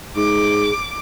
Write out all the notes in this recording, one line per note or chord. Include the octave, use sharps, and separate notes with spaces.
G#2 G#4 D6